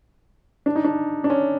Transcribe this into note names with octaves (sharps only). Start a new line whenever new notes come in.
D4
D#4
D4
D4
C#4